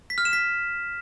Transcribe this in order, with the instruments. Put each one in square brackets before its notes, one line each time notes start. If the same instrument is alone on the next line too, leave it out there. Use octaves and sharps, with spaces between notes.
[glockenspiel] B6
F6
E7
B6